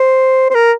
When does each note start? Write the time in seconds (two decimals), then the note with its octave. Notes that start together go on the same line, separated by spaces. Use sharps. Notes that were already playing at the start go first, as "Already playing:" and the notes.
Already playing: C5
0.50 C5
0.55 A#4